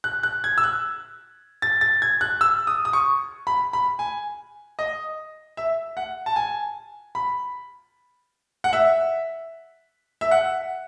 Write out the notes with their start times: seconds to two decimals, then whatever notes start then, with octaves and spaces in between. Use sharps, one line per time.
0.04 F#6
0.23 F#6
0.44 G#6
0.58 E6
0.64 F#6
1.62 A6
1.81 A6
2.02 G#6
2.21 F#6
2.41 E6
2.67 D#6
2.85 D#6
2.93 C#6
3.47 B5
3.73 B5
3.99 G#5
4.79 D#5
5.57 E5
5.97 F#5
6.26 A5
6.36 G#5
7.15 B5
8.64 F#5
8.73 E5
10.21 E5
10.31 F#5